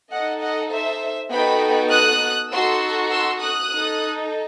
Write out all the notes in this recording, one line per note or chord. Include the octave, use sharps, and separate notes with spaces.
D#4 A4 D#5 F#5
D#5 F#5
C5 E5
B3 D#4 F#4 A4 G5 B5
D#6 F#6
D#4 F#4 A4 C6 E6
C6 E6
D#6 F#6
D#4 A4